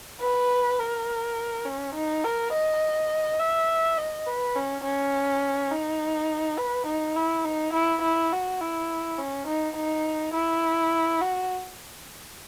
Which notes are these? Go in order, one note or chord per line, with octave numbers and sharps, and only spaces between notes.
B4
A#4
C#4
D#4
A#4
D#5
E5
D#5
B4
C#4
C#4
D#4
B4
D#4
E4
D#4
E4
E4
F#4
E4
C#4
D#4
D#4
E4
F#4